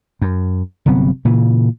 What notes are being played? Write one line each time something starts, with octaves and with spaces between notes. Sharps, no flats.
F#2
G1 C3 F#3 B3
A#2 C#3 E3